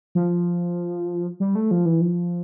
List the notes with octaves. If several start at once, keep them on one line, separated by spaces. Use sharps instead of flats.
F3
G3
A3
F3
E3
F3